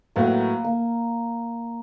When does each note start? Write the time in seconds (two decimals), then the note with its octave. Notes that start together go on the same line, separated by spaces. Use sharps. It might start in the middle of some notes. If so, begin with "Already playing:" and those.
0.16 A2 F#3 A#3 B3
0.64 A#3